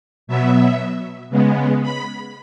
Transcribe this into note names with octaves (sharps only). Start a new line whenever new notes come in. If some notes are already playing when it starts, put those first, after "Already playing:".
B2 F#3 B3 E5
C#3 G#3 B3
B5